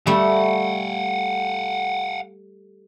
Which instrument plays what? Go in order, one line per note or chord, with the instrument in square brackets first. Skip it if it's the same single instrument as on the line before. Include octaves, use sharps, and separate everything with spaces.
[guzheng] G3 A3 [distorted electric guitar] F5 F#5